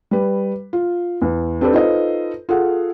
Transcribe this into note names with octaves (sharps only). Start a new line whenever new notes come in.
G3 B4
F4
E2
C4 D4 G4 A4 B4
D#4 F4 A4 B4 C5 D#5
F4 G#4 A4 F#5